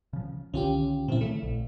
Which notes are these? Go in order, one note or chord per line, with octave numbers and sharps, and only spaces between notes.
C#3 F3
C2 D3 D#3 C#4 F4 G4
A#2 D#3 F3 C4 E4
C#3 A3
A#1